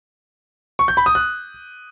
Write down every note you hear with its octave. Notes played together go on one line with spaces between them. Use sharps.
C#6
G6
B5
D#6
F#6